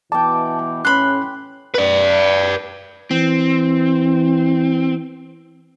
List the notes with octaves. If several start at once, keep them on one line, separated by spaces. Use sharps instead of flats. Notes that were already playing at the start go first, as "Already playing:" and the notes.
B2 E3 G5 A5 D6
A2 C#4 B5 C6 F#6
B4 D5
E3 C4